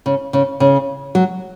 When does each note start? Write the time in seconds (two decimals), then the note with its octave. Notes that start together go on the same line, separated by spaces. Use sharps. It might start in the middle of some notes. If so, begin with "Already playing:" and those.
0.06 C#3
0.33 C#3
0.60 C#3
1.15 F#3